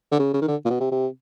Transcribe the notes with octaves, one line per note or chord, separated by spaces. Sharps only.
D3
C#3
C#3
D#3
D3
A#2
B2
C3
C3